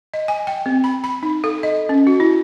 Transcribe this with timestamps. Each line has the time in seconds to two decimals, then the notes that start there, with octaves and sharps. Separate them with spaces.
0.14 D#5
0.28 G#5
0.47 G5
0.66 C4
0.84 B5
1.04 B5
1.23 D#4
1.44 A4
1.63 D#5
1.89 C#4
2.07 F#4
2.20 E4